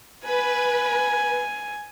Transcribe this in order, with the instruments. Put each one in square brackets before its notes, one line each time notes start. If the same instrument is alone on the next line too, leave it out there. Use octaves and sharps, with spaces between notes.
[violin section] B4 [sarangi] G#5